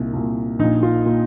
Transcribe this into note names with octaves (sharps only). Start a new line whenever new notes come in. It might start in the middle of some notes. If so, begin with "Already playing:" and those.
Already playing: C2 A#2 D#4
C2 A#2
A#1 A#2 D#4
F4
A#2